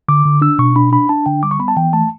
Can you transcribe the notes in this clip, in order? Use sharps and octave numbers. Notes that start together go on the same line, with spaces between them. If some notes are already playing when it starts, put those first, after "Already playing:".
D3 D6
D3
D4 E6
B2 C#6
D4 B5
D4 B5
D4 A5
D3 G5
G3 D6
C#6
B3 B5
A5
E3 G5
A3 A5